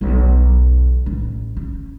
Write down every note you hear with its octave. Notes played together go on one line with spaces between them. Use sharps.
B1 E2
A1
C#4